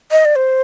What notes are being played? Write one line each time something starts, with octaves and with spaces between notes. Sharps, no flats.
D#5
D5
C5